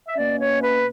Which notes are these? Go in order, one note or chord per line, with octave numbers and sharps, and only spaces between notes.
E5
B2 A#3 C#4 D5
C#5
B4